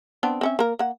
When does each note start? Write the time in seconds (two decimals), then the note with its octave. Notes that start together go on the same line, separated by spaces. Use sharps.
0.23 B3 C4 D4
0.41 C4 C#4 E5
0.59 A#3 A#4
0.79 A#3 F#5